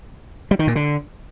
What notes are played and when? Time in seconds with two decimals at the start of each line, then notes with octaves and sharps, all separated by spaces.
0.51 G3
0.59 D#3
0.67 A#2
0.76 D3